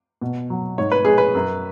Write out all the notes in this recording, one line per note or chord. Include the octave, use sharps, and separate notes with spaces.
B2
F#3
G#2 C#5
B4
G#3 G#4
B4
F#2